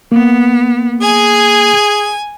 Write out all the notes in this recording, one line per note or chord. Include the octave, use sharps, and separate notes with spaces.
A#3 B3
G#4 G#5